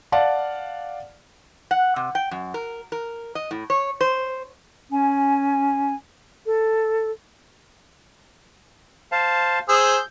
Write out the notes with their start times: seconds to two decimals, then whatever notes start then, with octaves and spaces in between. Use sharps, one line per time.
0.12 D5 F5 F#5 A5
1.71 F#5
1.96 C3
2.15 G5
2.31 F#2
2.54 A#4
2.92 A#4
3.35 D#5
3.51 A2
3.70 C#5
4.01 C5
4.90 C#4 G#5
6.47 A4
9.12 C5 F5 A5
9.69 G#4 C5 E6 G6